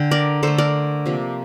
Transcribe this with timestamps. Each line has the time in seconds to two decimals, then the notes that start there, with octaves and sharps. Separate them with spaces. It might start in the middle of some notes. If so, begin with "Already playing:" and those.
Already playing: D3 G5
0.11 A#4 D5
0.43 D3 A3 A4 C5
0.58 A#4 D5
1.06 C3 F3 A#3